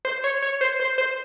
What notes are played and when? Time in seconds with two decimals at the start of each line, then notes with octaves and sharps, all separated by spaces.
0.05 C5
0.24 C#5
0.42 C#5
0.61 C5
0.80 C5
0.98 C5